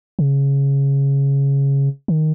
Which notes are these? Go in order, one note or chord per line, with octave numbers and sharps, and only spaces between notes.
C#3
D#3